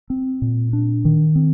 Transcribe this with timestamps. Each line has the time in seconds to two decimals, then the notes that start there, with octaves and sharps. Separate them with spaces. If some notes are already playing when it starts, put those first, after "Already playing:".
0.10 C4
0.42 A#2
0.73 D4
1.05 D#3
1.35 C4